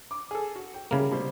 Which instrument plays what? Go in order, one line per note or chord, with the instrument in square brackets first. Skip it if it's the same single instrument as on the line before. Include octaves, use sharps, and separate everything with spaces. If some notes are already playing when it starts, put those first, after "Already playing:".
[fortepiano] D6
G#4 A4
F#4
G5
[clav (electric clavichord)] C#3 A#3 [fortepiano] G3 E4 A#4
[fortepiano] B2 G3 C5